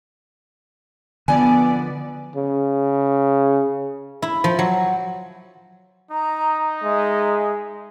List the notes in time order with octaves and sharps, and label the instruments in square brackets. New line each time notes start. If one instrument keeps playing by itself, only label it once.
[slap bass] D3 F3 [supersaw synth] B3 D5 [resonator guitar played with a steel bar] G#5
[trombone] C#3
[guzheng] E4
F3
F#3
[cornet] D#4 [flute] A#5
[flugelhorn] G#3 [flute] E5